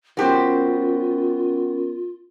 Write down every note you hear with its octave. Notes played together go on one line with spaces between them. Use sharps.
F#3 B3 C#4 F4 G4 A#4 C5